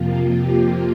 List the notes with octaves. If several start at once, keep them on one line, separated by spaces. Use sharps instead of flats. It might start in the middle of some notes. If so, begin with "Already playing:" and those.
Already playing: F2 C3 F3 A#3 F4
G4